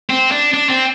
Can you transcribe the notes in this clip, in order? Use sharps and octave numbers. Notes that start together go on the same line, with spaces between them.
C4
D4
D4
C4